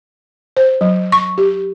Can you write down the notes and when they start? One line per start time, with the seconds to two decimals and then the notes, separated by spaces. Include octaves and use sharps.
0.57 C5
0.81 F#3
1.12 C#6
1.38 G4